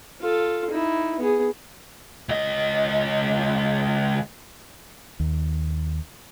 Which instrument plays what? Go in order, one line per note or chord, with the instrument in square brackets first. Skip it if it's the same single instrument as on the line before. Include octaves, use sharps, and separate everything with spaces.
[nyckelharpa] F4 A4
D#4 E4
B3 G#4
[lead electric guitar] C#2 D#5
[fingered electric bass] D#2